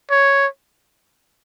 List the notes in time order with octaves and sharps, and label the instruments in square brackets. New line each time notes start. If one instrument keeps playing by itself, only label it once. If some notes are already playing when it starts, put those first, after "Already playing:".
[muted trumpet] C#5